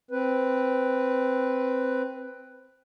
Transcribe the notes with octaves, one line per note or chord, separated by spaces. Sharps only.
C4 B4